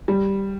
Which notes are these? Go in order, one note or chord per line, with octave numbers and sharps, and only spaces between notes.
G3